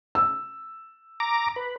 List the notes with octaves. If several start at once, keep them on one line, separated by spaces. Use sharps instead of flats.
E6
A#5 D6
B4